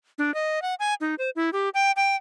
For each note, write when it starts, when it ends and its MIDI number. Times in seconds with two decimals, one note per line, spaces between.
0.18 0.34 62
0.34 0.62 75
0.62 0.74 78
0.80 0.94 80
1.01 1.15 63
1.18 1.30 72
1.36 1.50 64
1.53 1.69 67
1.74 1.91 79
1.96 2.16 79